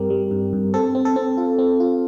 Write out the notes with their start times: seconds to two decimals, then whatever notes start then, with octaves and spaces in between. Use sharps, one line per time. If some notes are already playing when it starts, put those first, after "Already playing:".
Already playing: G2 G3 C4 G4 A#4
0.10 G3
0.31 G2
0.53 G2
0.74 C4 A4
0.95 C4
1.05 A4
1.16 C4
1.37 F4
1.59 C4
1.80 F4